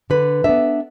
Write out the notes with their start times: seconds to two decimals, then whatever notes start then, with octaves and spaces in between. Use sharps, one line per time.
0.10 D3 B4
0.44 B3 D4 E5